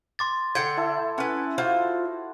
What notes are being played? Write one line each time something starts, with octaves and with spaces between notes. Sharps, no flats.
C6 D6 A6
D3 F#5 G5 G#6
E4 A4
C#4 B4 F#5
F4 F#4 C5